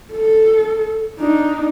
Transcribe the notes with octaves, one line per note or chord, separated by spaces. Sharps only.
A4
D4 D#4